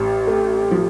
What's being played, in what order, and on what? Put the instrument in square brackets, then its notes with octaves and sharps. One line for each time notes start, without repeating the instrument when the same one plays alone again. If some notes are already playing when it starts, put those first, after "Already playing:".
Already playing: [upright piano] A1 [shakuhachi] G4
[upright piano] A3
F3